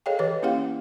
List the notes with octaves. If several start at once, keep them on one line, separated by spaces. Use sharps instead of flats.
G#4 A4 C#5 D#5 F5 G5
E3 G4 B4 C#5 D#5
A#3 C#4 E4 G4 F5 F#5